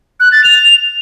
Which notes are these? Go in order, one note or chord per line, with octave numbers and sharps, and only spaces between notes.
F#6
A6
F7